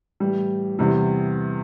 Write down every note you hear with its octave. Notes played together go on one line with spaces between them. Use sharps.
A2 E3 G3
E2 C3 E3 G3